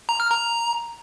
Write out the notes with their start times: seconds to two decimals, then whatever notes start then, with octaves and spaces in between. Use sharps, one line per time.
0.09 A#5
0.20 F6
0.31 A#5